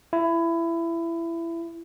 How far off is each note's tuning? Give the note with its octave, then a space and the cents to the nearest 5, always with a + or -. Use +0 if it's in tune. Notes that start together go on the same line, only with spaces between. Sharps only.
E4 +20